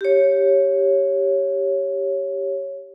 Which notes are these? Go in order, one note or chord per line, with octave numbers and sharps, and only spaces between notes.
G4 C#5